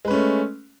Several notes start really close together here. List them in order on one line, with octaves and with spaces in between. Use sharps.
G#3 B4 C#4 A3